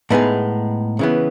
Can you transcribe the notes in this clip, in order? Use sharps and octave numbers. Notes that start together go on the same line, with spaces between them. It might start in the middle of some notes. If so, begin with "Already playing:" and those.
A2 G#3 B3 D#4 G#4
C#3 E3 B3